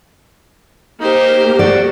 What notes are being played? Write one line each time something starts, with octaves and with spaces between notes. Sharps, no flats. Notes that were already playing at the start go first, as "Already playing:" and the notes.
A#3 D#4 G4 C5
F#4 D5